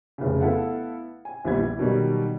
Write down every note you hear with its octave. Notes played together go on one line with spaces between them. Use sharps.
F1 C#3
B3 E4 A4 F5 F#5
G#5
A#1 E3 G3 B3 G#6
E3
B2 D#3 F#3 G3